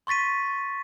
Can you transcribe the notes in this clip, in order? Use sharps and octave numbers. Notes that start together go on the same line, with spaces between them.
C6 C#6 A6 B6 D#7